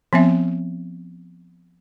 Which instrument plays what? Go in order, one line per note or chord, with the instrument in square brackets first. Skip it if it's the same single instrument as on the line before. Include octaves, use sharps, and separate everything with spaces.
[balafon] F3 B3 C4 E5